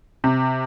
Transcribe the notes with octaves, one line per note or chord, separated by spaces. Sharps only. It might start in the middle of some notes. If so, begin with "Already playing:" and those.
C3